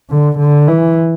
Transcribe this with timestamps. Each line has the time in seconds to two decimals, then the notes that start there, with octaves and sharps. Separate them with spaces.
0.10 D3
0.39 D3
0.67 E3